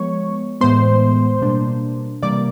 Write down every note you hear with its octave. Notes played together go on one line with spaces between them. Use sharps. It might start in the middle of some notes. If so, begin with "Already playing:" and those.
Already playing: F3 G#3 B3 C#5 C#6
A2 E3 G#3 B3 C5 C6
B2 G3 A#3 D4
C3 E3 G3 A#3 D5 D6